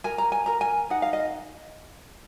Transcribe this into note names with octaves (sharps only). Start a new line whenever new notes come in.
A#4 G#5
A#5
G#5
A#4 A#5
G#5
D#4 F#5
F5
D#5